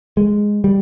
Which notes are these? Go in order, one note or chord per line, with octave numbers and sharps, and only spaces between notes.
G#3
G3